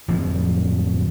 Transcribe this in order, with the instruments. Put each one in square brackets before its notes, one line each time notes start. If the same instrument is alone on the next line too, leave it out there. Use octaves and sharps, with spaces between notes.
[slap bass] D1 F2 F3